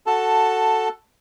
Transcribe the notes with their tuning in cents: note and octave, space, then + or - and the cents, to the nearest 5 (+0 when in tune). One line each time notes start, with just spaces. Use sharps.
F#4 +0 A4 +5 A5 +10